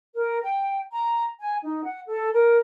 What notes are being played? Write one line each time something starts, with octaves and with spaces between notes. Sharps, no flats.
A#4
G5
A#5
G#5
D#4
F#5
A4
A#4